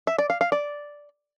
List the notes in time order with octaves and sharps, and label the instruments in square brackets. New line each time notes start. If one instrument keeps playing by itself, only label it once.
[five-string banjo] E5
D5
F5
F5
D5